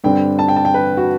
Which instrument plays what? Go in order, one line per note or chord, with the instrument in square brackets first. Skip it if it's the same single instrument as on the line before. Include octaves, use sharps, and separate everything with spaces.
[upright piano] G2 D3 G3 C4 G5
A5
G5
A5
G5
B4
F#4